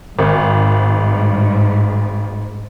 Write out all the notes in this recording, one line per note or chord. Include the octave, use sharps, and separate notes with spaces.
G#1 G#2